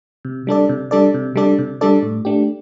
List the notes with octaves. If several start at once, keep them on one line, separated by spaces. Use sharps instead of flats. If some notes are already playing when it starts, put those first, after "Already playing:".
C3
G3 D4 A4 D5
C3
G3 D4 A4 D5
C3
G3 D4 A4 D5
C3
G3 D4 A4 D5
A2
A3 D4 G4